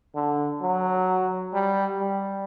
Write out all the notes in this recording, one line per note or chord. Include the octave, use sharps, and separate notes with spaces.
D3
F#3
G3
G3